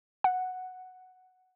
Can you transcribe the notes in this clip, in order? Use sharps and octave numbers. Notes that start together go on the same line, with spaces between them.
F#5